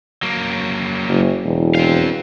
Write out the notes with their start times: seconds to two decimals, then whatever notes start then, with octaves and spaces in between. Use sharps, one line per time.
0.23 F#3 A#3
1.09 F#1
1.44 E1
1.75 C4 F5